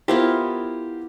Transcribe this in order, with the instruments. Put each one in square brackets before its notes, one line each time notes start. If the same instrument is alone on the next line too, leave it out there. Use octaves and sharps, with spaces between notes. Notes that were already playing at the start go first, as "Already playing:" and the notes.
[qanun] B3 E4 F4 [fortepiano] G4 A#4 C5